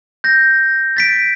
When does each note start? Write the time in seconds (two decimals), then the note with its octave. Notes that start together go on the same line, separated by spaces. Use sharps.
0.24 G6 A#6
0.97 A6 B6 D7